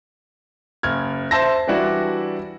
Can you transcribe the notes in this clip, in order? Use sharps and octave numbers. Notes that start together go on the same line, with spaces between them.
F#1 F6 G#6
C5 E5 A5 E6 A#6
E3 G3 D4 E4 F#4